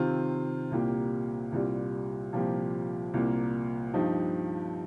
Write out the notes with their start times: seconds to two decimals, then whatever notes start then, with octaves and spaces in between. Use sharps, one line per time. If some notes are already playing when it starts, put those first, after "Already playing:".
Already playing: C3 D#3 C4 F4
0.71 C2 A#2 A#3 G4
1.52 C2 A#2 G3
2.33 C2 A#2 F3 A#3 G4
3.14 C2 A#2 A#3
3.94 G2 F3 D#4 G4